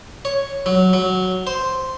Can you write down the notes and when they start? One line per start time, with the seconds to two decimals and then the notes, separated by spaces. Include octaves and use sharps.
0.25 C#5
0.66 F#3
0.93 F#3
1.47 C5